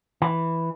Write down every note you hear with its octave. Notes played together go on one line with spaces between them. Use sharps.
E3